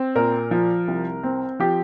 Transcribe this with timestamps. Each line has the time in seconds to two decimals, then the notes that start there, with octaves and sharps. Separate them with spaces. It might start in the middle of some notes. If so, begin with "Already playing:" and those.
Already playing: C4
0.16 A#2 A#4
0.51 F3
0.88 C2
1.23 C4
1.60 F3 G4